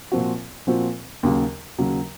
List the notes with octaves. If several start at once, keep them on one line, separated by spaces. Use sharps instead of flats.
A#2 F3 C4 F#4
A#2 F3 C4 F#4
D#2 C#3 F#3
D#2 C#3 F#3